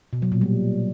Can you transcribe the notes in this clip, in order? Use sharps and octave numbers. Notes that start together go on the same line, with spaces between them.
B2
F#3
A#2
G3